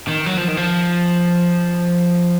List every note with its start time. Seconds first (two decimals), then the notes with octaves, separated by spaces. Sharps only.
0.08 D#3
0.26 F#3
0.37 F3
0.48 D#3
0.57 F3